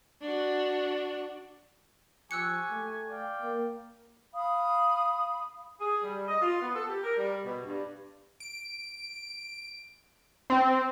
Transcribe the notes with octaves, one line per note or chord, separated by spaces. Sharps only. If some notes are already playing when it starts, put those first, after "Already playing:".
D4 F#4
F3 G4 G#5 C#6 E6 F#6 C#7
A3
D5 F5 G5
A#3
F5 B5 D#6
G#4
G3
D#5
F4
B3
A4
G4
A#4
G3
B2
G2
D7
C4